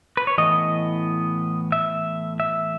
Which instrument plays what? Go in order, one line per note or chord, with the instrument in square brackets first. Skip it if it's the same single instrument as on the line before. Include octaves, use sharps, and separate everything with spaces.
[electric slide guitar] B4
C#5
A2 E3 B3 D#5
E5
E5